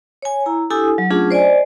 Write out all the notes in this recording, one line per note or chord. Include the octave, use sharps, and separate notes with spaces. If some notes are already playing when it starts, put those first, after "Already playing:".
C#5 G#5
E4 A#5
D4 E4 G4 A4 G#5 D#6
F#3
F#3 A3 C#4 D4 F4 G#4
C5 D5 D#5 G#5